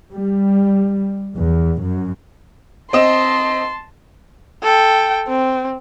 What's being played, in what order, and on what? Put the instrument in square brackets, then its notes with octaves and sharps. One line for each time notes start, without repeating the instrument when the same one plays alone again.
[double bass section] G3
E2
F#2
[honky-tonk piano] C4 D#5 E7 [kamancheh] A5 C6
[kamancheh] A4 G5
C4